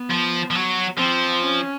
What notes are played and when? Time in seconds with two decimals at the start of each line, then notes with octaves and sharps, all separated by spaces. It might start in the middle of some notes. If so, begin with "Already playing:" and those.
Already playing: B3
0.10 F3
0.51 F3
0.55 F#3
0.98 F3 C4
1.42 C#4